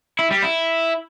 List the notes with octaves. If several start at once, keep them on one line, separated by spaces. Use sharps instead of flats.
E4
G3
E4